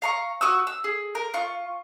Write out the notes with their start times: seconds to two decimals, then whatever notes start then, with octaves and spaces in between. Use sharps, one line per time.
0.02 F5 A#5 C#6
0.41 F#4 C#6 D#6 E6
0.67 E6
0.84 G#4
1.15 A#4
1.34 F4 C#6